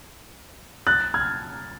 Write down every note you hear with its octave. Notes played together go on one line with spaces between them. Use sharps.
F#6 A6
F6 G#6